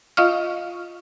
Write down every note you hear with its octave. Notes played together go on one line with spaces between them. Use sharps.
F4 D#5 F5 C#6 F6